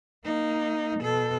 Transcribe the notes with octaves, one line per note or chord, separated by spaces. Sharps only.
A#3 D#4
B2 A4